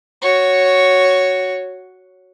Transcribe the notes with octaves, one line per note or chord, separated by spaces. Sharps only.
F#4 C#5